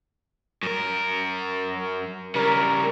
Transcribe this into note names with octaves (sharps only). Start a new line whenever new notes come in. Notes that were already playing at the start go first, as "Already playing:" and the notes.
F#2 A#4
C#3 G3 A#4